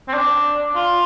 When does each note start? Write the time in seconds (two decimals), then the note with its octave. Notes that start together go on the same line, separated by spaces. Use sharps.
0.08 C4
0.14 D4
0.75 F4